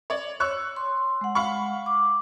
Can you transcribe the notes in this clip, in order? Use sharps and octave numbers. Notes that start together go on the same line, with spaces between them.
C#5 D5
C#5 C#6 E6 F#6
C6
G#3 F#5
F5 B5 C#6
D6